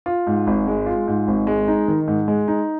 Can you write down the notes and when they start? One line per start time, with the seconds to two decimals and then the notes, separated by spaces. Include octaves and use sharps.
0.06 F4
0.27 G#2
0.47 G#1
0.67 G#3
0.86 F4
1.07 G#2
1.28 G#1
1.47 G#3
1.68 D#4
1.88 D#3
2.07 G#2
2.28 G#3
2.48 D#4